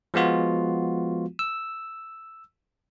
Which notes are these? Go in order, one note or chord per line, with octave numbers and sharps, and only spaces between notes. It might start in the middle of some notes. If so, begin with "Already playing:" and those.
F3 G#3 B3 F4 F#4
E6